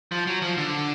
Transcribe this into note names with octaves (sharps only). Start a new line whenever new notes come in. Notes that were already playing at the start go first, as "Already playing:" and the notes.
F3
F#3
F3
D3